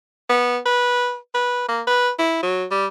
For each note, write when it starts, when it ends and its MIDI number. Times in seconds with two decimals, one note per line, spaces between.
0.29 0.58 59
0.66 1.17 71
1.34 1.68 71
1.68 1.82 58
1.87 2.11 71
2.19 2.41 64
2.43 2.65 54
2.71 2.87 55